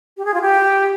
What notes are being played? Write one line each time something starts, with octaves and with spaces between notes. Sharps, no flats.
G4
G#4
F4
G4